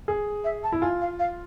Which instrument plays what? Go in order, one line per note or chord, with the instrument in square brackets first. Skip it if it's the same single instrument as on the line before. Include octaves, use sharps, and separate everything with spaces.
[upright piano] G#4
[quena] E5
A5
[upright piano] E4
[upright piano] F4 [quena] G#5
[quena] F5
F5